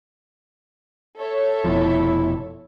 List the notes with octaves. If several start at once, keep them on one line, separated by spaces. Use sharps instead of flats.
A4 C#5 E5
F1 B2 F3 E4